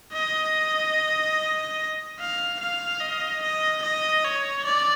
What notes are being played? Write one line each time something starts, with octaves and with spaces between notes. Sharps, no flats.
D#5
F5
F5
D#5
D#5
D#5
C#5
D5